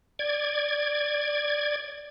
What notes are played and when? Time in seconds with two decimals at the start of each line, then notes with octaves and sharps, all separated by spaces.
0.19 D5 G#6